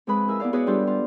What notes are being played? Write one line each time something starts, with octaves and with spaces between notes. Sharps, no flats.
F2 G#3 G#4 B4 B5
E4 G#4 A#4 E6
B3 E4 D5 F5
B3 F#4 G#4 B4 C#5 D5
G3 D4 F4 G4 A4
F4